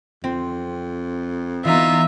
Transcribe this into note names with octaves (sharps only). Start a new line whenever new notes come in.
F2 C4
E3 B3 D#4 F4 E5